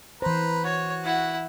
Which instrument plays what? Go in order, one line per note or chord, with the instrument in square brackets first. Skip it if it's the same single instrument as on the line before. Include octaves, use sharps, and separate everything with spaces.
[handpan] E3 C5 [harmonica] B4 A#5
[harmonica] F#4 [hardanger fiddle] C#5
[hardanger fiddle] E4 F#5